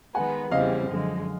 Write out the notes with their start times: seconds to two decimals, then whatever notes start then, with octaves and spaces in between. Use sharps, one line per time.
0.15 D#3 G#3 B3 F#5 G#5
0.51 E2 C#3 E3 G3 C4 D#5 F5
0.89 F#2 D3 F3 G#3